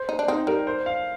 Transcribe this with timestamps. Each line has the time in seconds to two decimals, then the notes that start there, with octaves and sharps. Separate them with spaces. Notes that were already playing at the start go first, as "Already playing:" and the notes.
Already playing: C5
0.09 D#4
0.19 D4
0.28 C4 D#4
0.47 G3 A#4
0.67 C5
0.86 F5